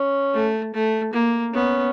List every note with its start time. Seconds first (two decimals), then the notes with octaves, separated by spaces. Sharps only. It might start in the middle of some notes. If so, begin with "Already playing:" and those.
Already playing: C#4
0.34 A3
0.74 A3
1.14 A#3
1.53 B3 C#4